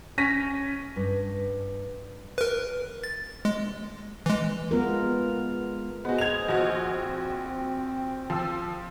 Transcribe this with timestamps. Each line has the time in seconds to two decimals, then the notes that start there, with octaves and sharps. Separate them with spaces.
0.18 C#4 A#6 B6 D#7
0.96 G2
2.38 A#4 B4
3.04 A6
3.45 G#3
4.26 E3 G#3
4.71 G#3 B3 F4 A#4
6.05 B3 F#4 G#4 C5 D#5
6.18 G#6 F7
6.49 A#1 F#4
6.89 C4
8.30 F3 E6